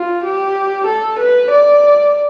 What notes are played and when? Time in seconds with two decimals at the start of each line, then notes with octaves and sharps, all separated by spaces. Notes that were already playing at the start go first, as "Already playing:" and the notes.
Already playing: F4
0.24 G4
0.87 A4
1.20 B4
1.51 D5